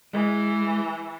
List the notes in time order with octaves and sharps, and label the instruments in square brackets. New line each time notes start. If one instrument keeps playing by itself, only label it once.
[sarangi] E3 [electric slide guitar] G#3